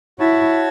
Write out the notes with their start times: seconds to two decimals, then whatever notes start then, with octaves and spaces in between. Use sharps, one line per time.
0.19 E4 F#4 C#5 A5